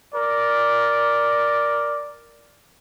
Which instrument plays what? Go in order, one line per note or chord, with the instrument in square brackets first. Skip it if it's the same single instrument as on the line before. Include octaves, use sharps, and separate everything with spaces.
[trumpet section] A#4 D5